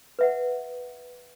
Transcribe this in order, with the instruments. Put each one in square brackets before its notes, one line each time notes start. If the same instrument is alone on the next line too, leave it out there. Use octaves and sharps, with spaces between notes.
[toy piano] B4 E5 F#5